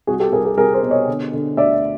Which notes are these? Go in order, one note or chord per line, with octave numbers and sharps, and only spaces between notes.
C2 F#4 G#4
G4 A4
C2 G#4 A#4
G#4 A#4
C2 G#4 A#4
A#4 C5
B2
C#5 D#5
D3
D3
D2 D5 E5